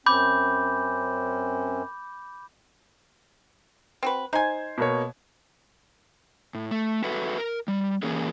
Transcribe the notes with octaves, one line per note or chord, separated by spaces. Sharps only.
F#2 C4 C#4 B5 D6 G6
C4 F#4 B4
D#4 C5 G#5 G#6
B2 A#3 C#5
A2
A3
F#4 A4 B4 E5 F#5
A#4
G3
E3 A#3 C#4 G#4 A#4